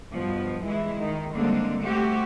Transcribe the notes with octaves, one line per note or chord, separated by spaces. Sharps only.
G2 B2 F3
E3 G#3 E4
D#3
D3 G3 G#3 A#3 C4 D4
A3 C4 F#4 G4